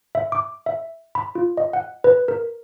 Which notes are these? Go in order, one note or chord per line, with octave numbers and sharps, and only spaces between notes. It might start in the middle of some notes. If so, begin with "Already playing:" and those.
E5
D6
E5
B5
F4
D#5
F#5
B4
A#4